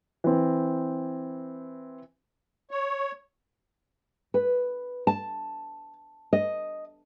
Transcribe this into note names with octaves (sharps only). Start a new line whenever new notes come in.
E3 C4
C#5
B4
A5
D#5